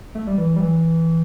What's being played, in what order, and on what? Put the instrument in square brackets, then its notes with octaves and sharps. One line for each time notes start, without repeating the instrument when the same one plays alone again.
[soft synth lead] A3
G3
E3
G3
E3